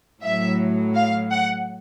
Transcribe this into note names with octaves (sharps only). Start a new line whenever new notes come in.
A2 F#3 E5
F5
F#5